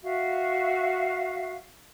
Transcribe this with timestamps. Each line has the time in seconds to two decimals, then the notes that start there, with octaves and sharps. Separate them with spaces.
0.04 F#4 E5 F5